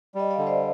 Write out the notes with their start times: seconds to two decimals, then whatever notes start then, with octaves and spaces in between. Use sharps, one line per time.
0.15 G3 D#5
0.30 D5 F5
0.38 D3
0.47 C5 D#5